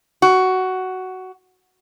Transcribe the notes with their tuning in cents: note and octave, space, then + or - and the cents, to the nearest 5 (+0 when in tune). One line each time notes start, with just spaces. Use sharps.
F#4 +10